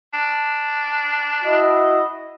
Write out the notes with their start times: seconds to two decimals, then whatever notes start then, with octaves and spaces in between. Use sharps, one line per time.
0.13 D4
1.44 E4 F#4 D#5